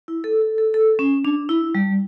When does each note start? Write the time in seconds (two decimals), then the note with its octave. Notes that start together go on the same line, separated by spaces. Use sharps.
0.08 E4
0.24 A4
0.41 A4
0.58 A4
0.74 A4
0.99 C#4
1.25 D4
1.49 E4
1.75 G3